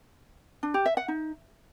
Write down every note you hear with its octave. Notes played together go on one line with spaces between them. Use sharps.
D4
G4
E5
F#5
D#4